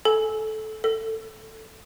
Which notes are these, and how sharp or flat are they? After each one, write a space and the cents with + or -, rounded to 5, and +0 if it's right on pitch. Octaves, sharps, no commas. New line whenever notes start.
A4 -15
A4 +15